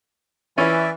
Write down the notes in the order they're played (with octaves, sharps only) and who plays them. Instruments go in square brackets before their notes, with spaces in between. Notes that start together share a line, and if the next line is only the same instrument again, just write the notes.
[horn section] E3 [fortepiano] C#4 E4 [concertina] D5 E5